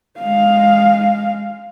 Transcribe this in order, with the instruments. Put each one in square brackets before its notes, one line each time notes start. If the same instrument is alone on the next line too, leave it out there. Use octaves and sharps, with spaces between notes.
[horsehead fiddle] G#3 F5